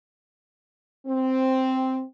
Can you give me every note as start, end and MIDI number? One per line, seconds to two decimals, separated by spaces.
1.07 2.02 60